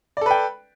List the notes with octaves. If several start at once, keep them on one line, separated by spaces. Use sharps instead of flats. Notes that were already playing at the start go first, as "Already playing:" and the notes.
A4 B4 D5 G5